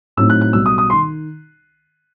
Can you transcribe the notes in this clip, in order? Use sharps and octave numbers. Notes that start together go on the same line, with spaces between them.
A2 F#3 C4 D#4 E6
F#6
F#6
B1 B2 G3 E6
D#6
D#6
D#3 C6